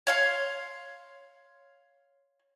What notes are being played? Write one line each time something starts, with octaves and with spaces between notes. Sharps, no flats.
C#5 F5 C6